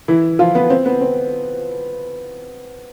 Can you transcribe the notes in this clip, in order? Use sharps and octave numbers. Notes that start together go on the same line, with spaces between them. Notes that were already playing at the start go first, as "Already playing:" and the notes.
E3 E4
F3 F4
B3 B4
C4
B3
C4